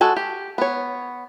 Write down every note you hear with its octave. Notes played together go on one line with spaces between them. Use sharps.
G#3 F#4 A4 G#5
G4
B3 C#5